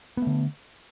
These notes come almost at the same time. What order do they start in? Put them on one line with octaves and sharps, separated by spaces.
B3 A3 D3